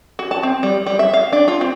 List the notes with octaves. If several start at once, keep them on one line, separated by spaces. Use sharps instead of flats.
F#4
A5
C4
G3
G3
E5
F5
D4
F4
C4